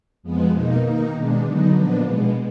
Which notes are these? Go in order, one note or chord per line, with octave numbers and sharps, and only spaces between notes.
F2 F3 G#3 B3
B2 A#3 D#4
D#3 A#3 D#4
B2 G#3 D4
D3 F#3 B3 D#4
A#2 F3 B3 D4
B2 G#3 B3